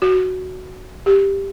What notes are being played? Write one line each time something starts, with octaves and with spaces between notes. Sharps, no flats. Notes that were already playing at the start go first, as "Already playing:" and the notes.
F#4
G4